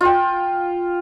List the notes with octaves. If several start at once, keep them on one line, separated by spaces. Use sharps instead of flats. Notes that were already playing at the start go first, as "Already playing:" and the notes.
F4 G5